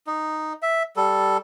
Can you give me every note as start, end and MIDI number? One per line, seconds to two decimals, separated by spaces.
0.07 0.53 63
0.62 0.83 76
0.96 1.37 55
0.96 1.37 69